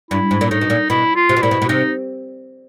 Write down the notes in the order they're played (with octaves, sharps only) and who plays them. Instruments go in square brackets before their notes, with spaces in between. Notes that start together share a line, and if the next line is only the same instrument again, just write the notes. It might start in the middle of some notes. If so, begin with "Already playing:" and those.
[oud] G2 [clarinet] E4
[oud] G#2
A#2
[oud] A2 [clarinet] D#4
[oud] B2
A#2
[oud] B2 [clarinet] E4
[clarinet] F4
[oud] C3
B2
[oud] A#2 [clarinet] E4
[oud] B2
B2
[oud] C3 [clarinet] D#4